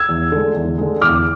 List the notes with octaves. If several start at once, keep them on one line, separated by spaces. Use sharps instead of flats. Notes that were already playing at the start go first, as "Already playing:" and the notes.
Already playing: E6 G#6
E2
D3 G#3
E2
D3 G#3
E2 D6 F6